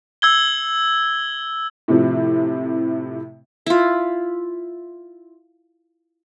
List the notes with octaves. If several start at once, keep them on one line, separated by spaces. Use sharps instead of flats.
E6 G#6 G7
A2 C3 F3
E4 F4